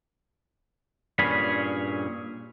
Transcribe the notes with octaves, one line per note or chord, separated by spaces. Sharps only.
G2 A#2 C#4 G#4 B5